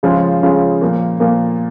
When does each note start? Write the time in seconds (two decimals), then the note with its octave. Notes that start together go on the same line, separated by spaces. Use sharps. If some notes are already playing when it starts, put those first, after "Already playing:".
0.03 C#3 F3 G#3 C#4 F4
0.43 C#3 F3 G#3 C#4 F4
0.82 A#2 F3 A#3
1.20 A#2 F3 A#3